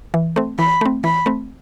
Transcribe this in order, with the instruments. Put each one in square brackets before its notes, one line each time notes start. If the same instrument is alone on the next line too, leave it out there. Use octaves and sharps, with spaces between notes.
[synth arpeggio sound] E3
A3 C4
[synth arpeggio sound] E3 [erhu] B5
[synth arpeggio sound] A3 C4
[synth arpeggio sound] E3 [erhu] B5
[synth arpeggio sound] A3 C4